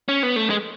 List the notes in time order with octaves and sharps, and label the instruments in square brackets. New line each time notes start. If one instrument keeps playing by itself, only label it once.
[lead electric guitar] C#4
B3
A3
G#3